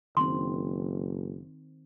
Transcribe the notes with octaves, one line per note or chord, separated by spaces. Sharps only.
F#1 D#3 C4 C6